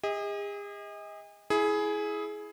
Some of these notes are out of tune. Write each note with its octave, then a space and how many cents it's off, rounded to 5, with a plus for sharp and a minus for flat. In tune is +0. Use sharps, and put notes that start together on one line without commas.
G#4 -40 D#5 +30
E4 +0 G#4 +15